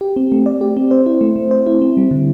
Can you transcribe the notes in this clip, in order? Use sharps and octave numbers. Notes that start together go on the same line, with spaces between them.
G4
C4
A3
D5
G4
C4
C5
E4
A3
A3
C5
E4
C4
G3
D3